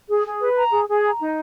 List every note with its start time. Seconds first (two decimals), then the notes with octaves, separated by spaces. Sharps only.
0.09 G#4
0.26 G#4
0.40 B4
0.56 A#5
0.72 G#4
0.88 G#4
1.04 A#5
1.20 D#4